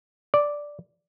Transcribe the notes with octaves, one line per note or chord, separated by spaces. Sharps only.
D5